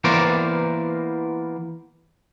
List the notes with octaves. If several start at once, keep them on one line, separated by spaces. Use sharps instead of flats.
E3 A#3 B3 A#4 C5 D5